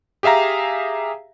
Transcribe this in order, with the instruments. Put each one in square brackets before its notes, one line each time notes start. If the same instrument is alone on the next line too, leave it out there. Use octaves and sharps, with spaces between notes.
[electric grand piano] G4 G#4 E5 F5 A#5